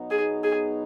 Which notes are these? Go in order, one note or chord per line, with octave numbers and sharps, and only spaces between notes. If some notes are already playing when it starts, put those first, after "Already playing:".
Already playing: B2 F#3 B3 D#4
G#4
G#4